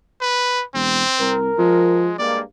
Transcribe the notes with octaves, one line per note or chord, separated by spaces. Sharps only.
B4
E1 C4
C2 A#4
F3 G#3
G2 G#3 A#3 D5